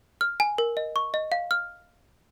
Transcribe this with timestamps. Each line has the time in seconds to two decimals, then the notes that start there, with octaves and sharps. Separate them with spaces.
0.21 F6
0.40 G#5
0.58 A#4
0.77 D#5
0.96 C#6
1.14 D#5
1.32 F5
1.51 F6